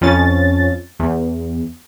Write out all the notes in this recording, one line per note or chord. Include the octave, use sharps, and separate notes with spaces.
F2 F3 C#4 A6
E2